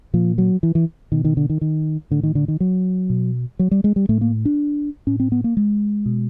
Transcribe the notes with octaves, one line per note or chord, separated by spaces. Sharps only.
A#2 F3
F#3
E3
E3
B2 D#3
D#3
D3
D#3
D#3
A2 D3
D#3
D3
D#3
F#3
B2
F#3
G3
G#3
G3
A2 A3
A#3
D4
A2 C#4
C4
B3
A#3
G#3
B2